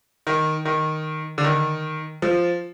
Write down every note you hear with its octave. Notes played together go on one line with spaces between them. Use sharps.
D#3
D#3
D3
D#3
F3